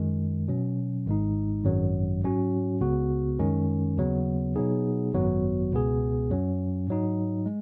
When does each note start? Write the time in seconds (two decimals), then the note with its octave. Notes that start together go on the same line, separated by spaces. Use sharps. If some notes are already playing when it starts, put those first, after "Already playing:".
Already playing: F#2 D#3 G#3
0.48 B2 F#3 C#4
1.06 G#1 G#2 G#3 D#4
1.64 G#1 F#2 F#3
2.23 G#2 F#3 C#4 F#4
2.81 C#2 C#3 B3 F#4
3.39 F#2 D#3 G#3 C#4
3.97 D#2 C#3 F#3 B3
4.56 B2 F#3 B3 D#4 G#4
5.13 G#1 F#2 F#3 B3 F#4
5.72 C#2 B2 B3 G#4
6.29 F#2 F#3 C#4
6.88 G#2 F#3 D#4
7.46 G#3